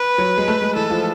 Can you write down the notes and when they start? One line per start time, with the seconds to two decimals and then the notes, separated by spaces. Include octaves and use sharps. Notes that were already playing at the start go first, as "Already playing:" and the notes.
Already playing: B4
0.18 F#3
0.38 G#3
0.48 A3
0.61 G#3
0.76 E3 A4
0.90 F3